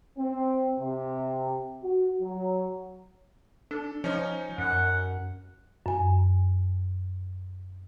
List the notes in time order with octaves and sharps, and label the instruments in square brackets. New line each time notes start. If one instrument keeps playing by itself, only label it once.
[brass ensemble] C4
C3
F#4
F#3
[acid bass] D4 [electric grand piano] A4
[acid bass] F3 [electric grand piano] C#4 D#4
[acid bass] F#2 [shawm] F#5
[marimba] F#2 G#5